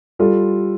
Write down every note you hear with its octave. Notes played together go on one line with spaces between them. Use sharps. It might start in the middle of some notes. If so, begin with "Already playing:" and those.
G3 F4 A4